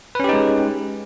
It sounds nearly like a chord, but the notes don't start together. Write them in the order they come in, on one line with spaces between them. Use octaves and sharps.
B4 C#4 G4 D#4 G#3